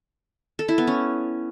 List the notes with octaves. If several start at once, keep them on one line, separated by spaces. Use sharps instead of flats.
A4
E4
B3
C#4